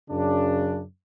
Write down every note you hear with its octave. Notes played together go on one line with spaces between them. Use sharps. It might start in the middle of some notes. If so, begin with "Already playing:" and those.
F#2 C#3 D4